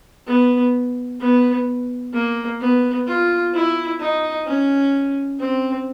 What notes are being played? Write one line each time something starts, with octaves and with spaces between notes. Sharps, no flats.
B3
B3
A#3
B3
F4
E4
D#4
C#4
C4